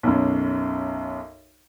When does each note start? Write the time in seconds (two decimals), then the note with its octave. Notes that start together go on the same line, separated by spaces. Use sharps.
0.03 B1 F#2